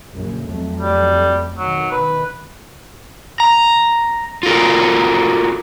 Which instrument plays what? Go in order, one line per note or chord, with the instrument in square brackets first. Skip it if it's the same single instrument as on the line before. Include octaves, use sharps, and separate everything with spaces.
[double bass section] A#1 F#2 C#3
F2 F#3 A3
[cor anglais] G3
[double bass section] B2 D#3 [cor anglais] F#3
[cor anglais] B4
[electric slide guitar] A#5
F4 F#4 A4 A#4